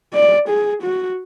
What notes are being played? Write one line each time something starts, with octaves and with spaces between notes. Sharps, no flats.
D5
G#4
F#4